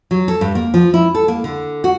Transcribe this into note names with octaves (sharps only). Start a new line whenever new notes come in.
F#3
A4
G2
A#3
F3
E4
A4
A#3
D3
F#4